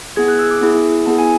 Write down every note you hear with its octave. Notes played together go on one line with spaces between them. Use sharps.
B3 E4 G#4 G#6
F#6
E6
D6
B3 E4 G#4
B3 E4 G#4 A5
G#5